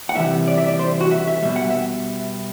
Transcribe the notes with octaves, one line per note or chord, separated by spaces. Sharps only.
F#5
C3 E3 G3 E5
D5
E5
D5
C5
F#4
E5
E5
B2 G3 E5
F#5
E5